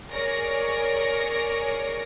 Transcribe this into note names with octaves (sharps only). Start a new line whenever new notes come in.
G#4 A#4 C#5 D5 A#6